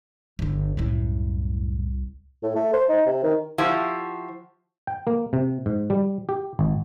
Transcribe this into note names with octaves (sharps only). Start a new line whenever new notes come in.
G1 D3
C2 F#2 A2
A2
A3
C5
D#4
C3
D#3
F3 E4 F#4 G4 C5
G5
A#3
C3
G#2
G3
G4
G#1